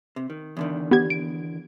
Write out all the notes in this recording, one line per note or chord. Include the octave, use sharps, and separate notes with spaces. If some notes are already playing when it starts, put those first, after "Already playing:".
C3
D#3
E2 D3 D#3
B3 G4 G#6
D7